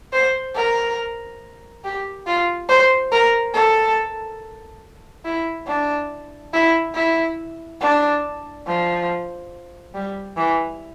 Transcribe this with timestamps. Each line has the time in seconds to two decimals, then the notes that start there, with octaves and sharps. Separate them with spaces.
0.13 C5
0.55 A#4
1.84 G4
2.27 F4
2.69 C5
3.12 A#4
3.54 A4
5.25 E4
5.67 D4
6.53 E4
6.95 E4
7.81 D4
8.67 F3
9.94 G3
10.37 E3